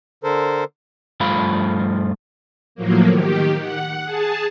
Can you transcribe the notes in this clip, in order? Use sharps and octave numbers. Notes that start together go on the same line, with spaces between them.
D3 A4 A#4 C5
G2 F3 A3 F4 F5 B5
A2 F3 F#3 A#3
D#3 G4
F#5
G#4 A5